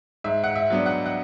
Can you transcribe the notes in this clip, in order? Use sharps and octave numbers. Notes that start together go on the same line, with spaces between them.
G#2 E5
F#5
E5
F#3 B3 D4
F#5
F#5